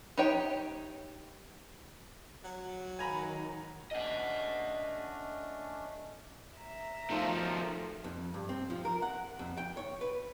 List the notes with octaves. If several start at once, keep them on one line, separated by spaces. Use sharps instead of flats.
D#4 G4 C#5 G5
F#3
D#3 G#5 A#5 B5
A3 C#4 D4 D#5 F#5
E5 A#5
D#3 F3 A3
F2
G2
C4
F3
A#4
F#5
F2
G5
C#5
B4